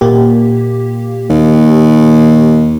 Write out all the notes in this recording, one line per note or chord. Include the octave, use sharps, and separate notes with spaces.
A#2 A#3 G4
D#2